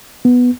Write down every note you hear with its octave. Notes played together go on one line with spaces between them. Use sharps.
B3